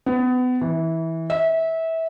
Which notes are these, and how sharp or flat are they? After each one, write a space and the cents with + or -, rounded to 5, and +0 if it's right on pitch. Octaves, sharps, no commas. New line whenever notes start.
B3 +30
E3 -20
E5 -20